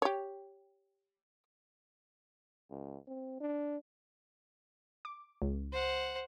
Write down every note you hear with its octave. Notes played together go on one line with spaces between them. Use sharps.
G4 C#5
C#2
C4
D4
D6
C#2
C5 F#5